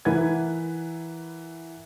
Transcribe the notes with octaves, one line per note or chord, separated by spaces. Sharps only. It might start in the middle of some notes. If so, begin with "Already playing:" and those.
E3 A#4 B4 F#5 G#6